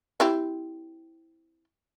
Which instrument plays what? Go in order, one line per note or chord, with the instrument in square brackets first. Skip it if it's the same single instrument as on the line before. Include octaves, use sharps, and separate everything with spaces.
[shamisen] C4 E4 G4